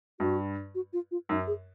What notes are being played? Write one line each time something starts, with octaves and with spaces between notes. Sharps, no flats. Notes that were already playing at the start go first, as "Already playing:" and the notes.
G2 F#4
F#4
F4
F4
F#2 D#4
G#4